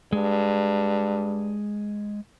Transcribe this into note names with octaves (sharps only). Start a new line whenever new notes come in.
G2 G#3